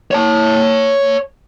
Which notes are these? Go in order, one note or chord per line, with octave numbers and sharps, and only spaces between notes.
C#5 A5